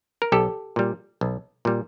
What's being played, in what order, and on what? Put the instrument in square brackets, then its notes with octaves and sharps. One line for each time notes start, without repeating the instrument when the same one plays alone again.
[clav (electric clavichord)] A#4
B1 G4 A4
A#2 G3
B1
A#2 G3